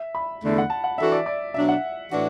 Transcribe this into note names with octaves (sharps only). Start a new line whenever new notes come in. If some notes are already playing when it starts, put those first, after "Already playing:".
Already playing: E5
B5
E2 D3 A3
F#5
A5
F#5
E3 D4 F#4 A4 E5
D5
D5
B2 F#3 D4 E5
F#5
A2 E3 D4 F#4